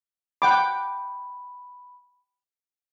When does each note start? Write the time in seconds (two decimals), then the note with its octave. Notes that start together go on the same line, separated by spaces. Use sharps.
0.42 F#5 G5 B5 D6